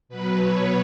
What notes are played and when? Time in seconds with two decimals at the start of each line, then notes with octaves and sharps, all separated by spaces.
0.09 B2 F#3 B4
0.38 C#5